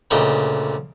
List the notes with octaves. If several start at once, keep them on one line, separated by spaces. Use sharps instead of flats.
D2 A#2 C#3 D#5 G5 B5